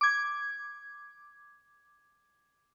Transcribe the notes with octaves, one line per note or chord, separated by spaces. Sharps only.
D6 G#6